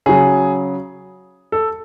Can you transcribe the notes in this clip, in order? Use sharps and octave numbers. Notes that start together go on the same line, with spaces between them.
C#3 F#3 G#4
A4